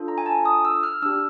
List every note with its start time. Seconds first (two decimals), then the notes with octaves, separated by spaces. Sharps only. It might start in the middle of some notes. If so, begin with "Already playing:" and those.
Already playing: D4 F4 A4
0.08 A#5
0.18 G#5
0.26 A5
0.45 D#6
0.65 E6
0.83 F6
1.02 D4 G4 E6